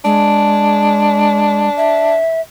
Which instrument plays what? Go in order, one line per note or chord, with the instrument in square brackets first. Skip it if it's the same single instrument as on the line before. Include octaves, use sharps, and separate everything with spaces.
[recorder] G#3 [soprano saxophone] D4
[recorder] E5